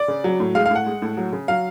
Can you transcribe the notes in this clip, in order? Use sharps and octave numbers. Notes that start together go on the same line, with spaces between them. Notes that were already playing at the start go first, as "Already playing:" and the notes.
Already playing: D5
C#3
F#3
A2
G#3 F5
F5
A2 F#5
G#3
A2
F#3
C#3
F#3 F5